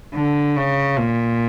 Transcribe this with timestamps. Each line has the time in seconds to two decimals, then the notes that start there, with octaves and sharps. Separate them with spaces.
0.15 D3
0.56 C#3
0.98 A#2